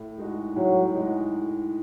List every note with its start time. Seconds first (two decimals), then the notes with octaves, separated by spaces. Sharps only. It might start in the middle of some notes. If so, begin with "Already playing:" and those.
Already playing: A2
0.18 G#3 D#4 F#4
0.56 A2 F#3
0.95 G#3 D#4 F#4